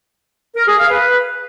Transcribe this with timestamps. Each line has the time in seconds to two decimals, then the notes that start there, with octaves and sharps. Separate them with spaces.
0.55 A#4
0.67 G#4
0.79 F5
0.90 B4